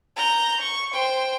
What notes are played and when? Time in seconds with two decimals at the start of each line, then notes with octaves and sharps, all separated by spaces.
0.16 A#5 G6
0.61 C#6
0.93 C5 G5